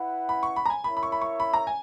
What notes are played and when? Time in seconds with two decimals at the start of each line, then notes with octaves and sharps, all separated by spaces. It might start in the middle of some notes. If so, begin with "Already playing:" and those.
Already playing: E4 B4 F#5
0.29 B5
0.43 C#6
0.56 B5
0.65 A#5
0.70 G#5
0.84 E4 A#4 C#5 E5 B5
0.97 B5
1.03 C#6
1.12 B5
1.21 C#6
1.40 B5
1.53 A#5
1.67 G#5